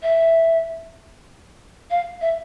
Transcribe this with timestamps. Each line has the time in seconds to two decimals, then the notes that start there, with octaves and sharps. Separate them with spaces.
0.03 E5
1.90 F5
2.21 E5